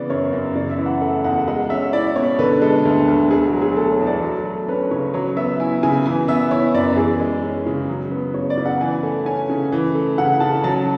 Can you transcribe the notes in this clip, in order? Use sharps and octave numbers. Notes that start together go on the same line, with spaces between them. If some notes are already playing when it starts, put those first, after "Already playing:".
Already playing: C#3 E3 B3 D5
F#2 C#5
F#2
C#3 D5
E5
E3
F#5
A3 F#5
E2 F#5
G#3 F#5
C#4 E5
E4 D5
B2 C#5
D3 B4
G#3 A4
D2
D2
B2 G#4
F#4
F#3
G#4
A3 A4
C#5
E2
D5
F#3
A3
C#4 B4
C#3 C#5
F#3 C#5
B3 E5
E4 G#5
C#3 G#5
E3 G#5
B3 E5
E4 C#5
F#2 D5
E3 G#4
G#3
C#4
C#3
F#3
B3
C#3 C#5
D5
C#3
F#5
E3 G#5
A3
C#4 G#5
C#3
E3
A3
C#3 F#5
C#3 A5
F#3 A5